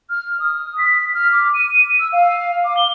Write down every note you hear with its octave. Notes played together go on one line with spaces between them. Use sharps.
F6
D#6
B6
F6
D6
D#7
E6
F5
D6
G7